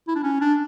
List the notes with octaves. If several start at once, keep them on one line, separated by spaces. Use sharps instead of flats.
E4
D4
C#4
D4